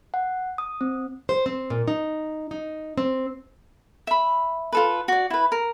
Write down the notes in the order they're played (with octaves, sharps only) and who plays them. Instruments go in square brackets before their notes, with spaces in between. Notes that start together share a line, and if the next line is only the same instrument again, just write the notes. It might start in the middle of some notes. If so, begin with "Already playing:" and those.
[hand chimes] F#5
D#6
C4
[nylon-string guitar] C5
C4
A#2
D#4
D#4
C4
[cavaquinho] E5 B5
F4 A4 B4
F#4 D5
E4 B4
A#4